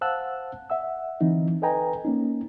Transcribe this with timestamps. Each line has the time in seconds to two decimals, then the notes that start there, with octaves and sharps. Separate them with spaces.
0.01 C5 F5 F#5 A5 E6 F#6
0.70 E5 F#5 E6
1.21 D3 E3 C4 D#4
1.62 A4 B4 D#5 G5 G#5 A#5
2.05 A#3 C#4 D#4